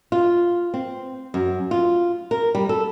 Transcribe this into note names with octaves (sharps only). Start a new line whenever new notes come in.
F4
C4
F#2
F4
A#4
G3
A4